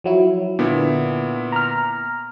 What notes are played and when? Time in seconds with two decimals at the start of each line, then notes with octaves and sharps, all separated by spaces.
0.04 F3 F#3 E4
0.59 A#2 D3 B3 E4
1.52 A#5 F6